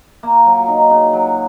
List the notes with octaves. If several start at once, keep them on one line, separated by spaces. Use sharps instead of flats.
A#3
F#3
D#4
C#3
F#3